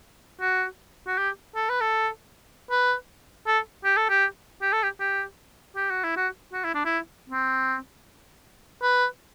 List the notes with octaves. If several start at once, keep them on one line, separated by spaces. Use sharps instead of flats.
F#4
F#4
G4
A4
B4
A4
B4
A4
G4
A4
G4
G4
A4
G4
G4
G4
F#4
E4
F#4
F#4
E4
D4
E4
C4
B4